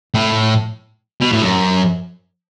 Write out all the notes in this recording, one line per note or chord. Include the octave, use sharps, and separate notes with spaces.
A2
B2
A2
F#2